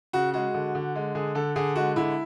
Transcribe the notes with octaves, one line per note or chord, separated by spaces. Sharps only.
C#3 F#4
G#3 F#4
D3
D3
G#3
D3 G#4
D3 A4
D3 G#4
G#3 F#4
D3 E4